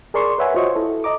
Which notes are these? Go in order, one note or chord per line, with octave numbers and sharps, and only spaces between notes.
G#4 A#4 D5 C6 C#6
B4 C#5 E5 F#5 G#5
F4 F#4 C5 C#5 D#5 C#6
E4 A4
D#5 A#5 D6